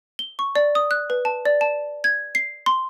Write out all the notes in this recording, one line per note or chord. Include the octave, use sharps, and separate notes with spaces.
G7
C#6
D5
D#6
F#6
B4
A5
D5
A5
G#6
C7
C6